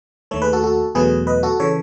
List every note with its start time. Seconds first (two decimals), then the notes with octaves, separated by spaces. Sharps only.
0.31 D#2 D#3 A3 A4 C#5
0.42 G#4 B4
0.53 F#4 A4
0.64 F#4 A4
0.95 E2 B2 F#3 A3 G#4 B4
1.27 B4 D#5
1.43 F#4 A4
1.60 C#3 E3 A4 C#5